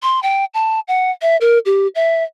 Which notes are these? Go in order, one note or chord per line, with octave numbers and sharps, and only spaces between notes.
C6
G5
A5
F#5
E5
A#4
G4
E5